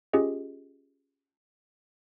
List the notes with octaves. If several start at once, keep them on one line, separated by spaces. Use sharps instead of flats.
C#4 F4 G4 G#4 D#5